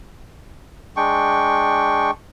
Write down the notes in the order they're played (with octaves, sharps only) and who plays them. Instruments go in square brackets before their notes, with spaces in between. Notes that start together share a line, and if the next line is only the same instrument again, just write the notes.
[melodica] G#3 D4 G5 C#6